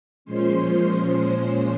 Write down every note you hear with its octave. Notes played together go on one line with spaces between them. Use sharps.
A#2 F3 G#3 C#4 C5 C6
C5 C6